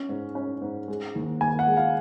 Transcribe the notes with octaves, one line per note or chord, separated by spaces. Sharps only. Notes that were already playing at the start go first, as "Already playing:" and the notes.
Already playing: C#4
G#2
C#4
G#2
G#3
D#2
D#2 G#5
F#5
G#3
F5